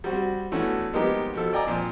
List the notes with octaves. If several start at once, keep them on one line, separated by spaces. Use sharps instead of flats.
G3 C4 F#4
E3 A3 B3 C#4 D4 F#4
F3 G#3 A#3 B3 D#4 G4
B2 F3 A4
D5 D#5 G5 G#5 A#5 D6
A#2 F3 C4